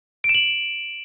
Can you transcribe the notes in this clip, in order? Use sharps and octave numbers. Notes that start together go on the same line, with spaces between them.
D7
E7
F#7